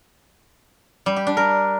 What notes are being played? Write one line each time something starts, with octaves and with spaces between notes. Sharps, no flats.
G3
G4
D4
A#4